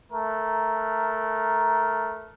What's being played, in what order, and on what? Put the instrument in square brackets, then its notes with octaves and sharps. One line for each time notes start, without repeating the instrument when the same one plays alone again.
[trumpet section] A3 A#4